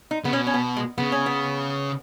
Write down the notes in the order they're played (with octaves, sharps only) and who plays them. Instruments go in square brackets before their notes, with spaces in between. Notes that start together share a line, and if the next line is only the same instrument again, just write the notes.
[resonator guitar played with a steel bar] D#4
[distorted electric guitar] C#3 [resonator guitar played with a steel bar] B3
[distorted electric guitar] B2 [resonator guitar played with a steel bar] C#4
[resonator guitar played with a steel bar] C#4
B3
G#3
[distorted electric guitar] C#3 [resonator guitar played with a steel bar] B3
[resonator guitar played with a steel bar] C#4
B3